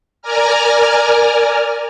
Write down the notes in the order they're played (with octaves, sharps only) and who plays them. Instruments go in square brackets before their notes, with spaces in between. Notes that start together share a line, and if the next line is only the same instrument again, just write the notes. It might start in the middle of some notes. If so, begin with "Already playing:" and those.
[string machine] A#4 D5 G#5 A#5 F6